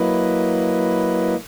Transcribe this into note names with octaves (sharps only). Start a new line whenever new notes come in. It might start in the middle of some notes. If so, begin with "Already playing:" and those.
Already playing: F#3 A#3 E4 B4 D#5